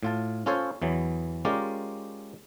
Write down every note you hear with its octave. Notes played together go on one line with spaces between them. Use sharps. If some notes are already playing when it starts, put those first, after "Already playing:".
A2 F4 A5
C#4 F4 A4 C5 C#5
E2 E3 F#3
G#3 C#4 F4 G4 A#4 D5